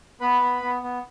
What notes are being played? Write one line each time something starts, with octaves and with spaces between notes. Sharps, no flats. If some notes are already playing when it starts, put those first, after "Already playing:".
B3 B4 B5
B3
B3
B3